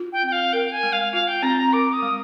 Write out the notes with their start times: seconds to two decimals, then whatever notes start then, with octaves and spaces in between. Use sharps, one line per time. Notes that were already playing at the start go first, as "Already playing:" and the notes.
Already playing: F4
0.13 G5
0.23 C4 G5
0.32 F5
0.53 A#4 G5
0.72 G#5
0.83 G#3
0.93 F5
1.13 F4 F5
1.28 G5
1.42 C4 A#5
1.57 A#5
1.72 A#4 D6
1.93 D#6
2.02 G#3